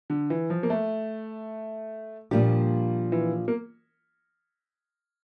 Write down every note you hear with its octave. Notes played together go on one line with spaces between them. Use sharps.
D3
E3
F3
A#3
A3
A#2 F3 G3 A#3 D4 G4
E3
A#3